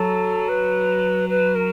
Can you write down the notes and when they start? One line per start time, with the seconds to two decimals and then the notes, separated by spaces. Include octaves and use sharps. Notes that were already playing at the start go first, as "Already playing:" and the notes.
Already playing: F#3 A4
0.49 B4
1.29 B4
1.55 A#4